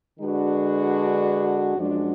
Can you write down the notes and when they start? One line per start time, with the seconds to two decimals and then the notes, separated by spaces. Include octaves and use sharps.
0.19 D3 G#3 D4 F#4 B4
1.77 F#2 F3 G#3 D4 F#4